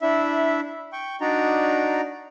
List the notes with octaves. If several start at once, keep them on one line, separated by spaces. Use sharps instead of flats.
D4 E4 E5
G5 C#6
D4 D#4 F#4 D5 A#5